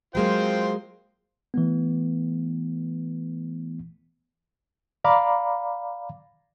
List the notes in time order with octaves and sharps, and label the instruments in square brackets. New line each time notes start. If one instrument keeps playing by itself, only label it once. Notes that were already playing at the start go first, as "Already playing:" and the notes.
[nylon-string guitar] F#3 G#3 A#3 [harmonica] F4 C5 G5
[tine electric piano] E3 A3 B3
[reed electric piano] D5 F5 A#5 B5 D6